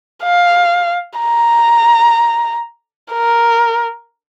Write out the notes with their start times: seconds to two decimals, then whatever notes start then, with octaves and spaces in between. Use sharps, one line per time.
0.23 F5
1.19 A#5
3.12 A#4